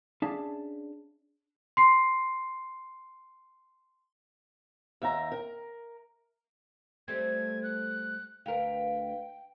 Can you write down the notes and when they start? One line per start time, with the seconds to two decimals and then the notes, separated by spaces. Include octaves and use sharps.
0.22 C#4 D4 G#4 E5 F5 A5
1.77 C6 C7
5.02 D#2 E5 G5 A#5
5.32 A#4
7.08 G3 A3 C4 G#6
7.63 F#6
8.46 D2 A#4 B4 F5 G5